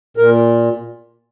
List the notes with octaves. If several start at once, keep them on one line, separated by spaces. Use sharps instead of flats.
A#2 A#4